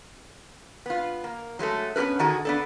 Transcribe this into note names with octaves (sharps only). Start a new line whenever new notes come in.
B3 F4
A#3
F#3 G#3 A3 A4
B3 C#4 G4 A#4 B4
D3 D#3 F#4 G#4 A4
B3 D4 A4